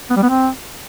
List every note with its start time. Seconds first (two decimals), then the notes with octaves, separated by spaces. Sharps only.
0.10 B3
0.17 G3
0.23 B3
0.29 C4